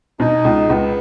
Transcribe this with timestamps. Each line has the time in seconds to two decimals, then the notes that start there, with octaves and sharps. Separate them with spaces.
0.20 B2 D#4
0.45 C#2
0.69 C#2 B3